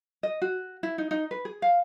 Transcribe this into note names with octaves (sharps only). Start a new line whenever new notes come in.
D#5
F#4
E4
D#4
D#4
B4
G#4
F5